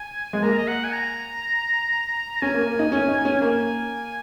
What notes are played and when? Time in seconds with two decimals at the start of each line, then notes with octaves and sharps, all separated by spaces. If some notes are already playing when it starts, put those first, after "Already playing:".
Already playing: G#5
0.33 G#3
0.43 A#3 A#5
0.58 D#5
0.68 F#5
0.84 G#5
0.93 A#5
2.36 A#5
2.42 C#4 G#5
2.54 A#3
2.67 A#3
2.79 D#4
2.92 C#4
3.08 D#4
3.25 C#4
3.41 A#3 G#5